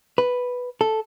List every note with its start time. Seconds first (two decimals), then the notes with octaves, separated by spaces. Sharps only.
0.18 B4
0.81 A4